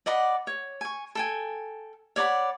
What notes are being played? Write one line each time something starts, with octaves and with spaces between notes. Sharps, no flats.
D5 D#5 F#5 B5
C#5
G#5 C#6
A4 G5 G#5
C#5 D5 F#5 B5